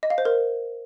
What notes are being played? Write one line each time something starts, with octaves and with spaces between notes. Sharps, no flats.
D#5
F5
C5
A#4